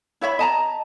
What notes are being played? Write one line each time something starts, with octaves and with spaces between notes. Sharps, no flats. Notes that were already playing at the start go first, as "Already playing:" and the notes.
E4 C#5 E5 B5
D#5 A5 A#5